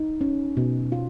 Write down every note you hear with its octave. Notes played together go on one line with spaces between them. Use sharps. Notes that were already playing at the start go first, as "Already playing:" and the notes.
Already playing: D#4
C#4
B2
F4